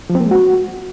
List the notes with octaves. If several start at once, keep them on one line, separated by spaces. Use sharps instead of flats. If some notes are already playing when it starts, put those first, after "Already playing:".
F3
C4
A#3
G#3
F#4